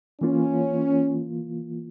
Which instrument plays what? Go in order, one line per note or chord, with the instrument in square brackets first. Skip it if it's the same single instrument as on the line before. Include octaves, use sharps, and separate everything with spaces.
[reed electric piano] E3 A#3 F4 [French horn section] C#4